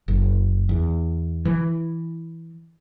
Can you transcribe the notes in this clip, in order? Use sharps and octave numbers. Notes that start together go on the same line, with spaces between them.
F#1
E2
E3